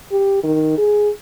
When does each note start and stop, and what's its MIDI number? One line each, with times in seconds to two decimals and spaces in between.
0.12 0.42 67
0.43 0.74 51
0.77 1.09 68